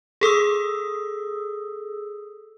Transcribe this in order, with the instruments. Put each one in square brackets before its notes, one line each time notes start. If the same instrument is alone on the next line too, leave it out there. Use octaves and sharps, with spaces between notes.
[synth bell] G#4 A4 D#6 E6